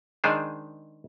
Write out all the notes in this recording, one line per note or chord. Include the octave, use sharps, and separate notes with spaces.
D#3 G#3 D4 G#4 C5